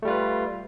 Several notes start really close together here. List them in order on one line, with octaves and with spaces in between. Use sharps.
A3 G3 F4 B4